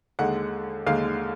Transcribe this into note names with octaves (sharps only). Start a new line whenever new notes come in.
D#2 D3 G#3 F#5
D#2 D3 G#3 F5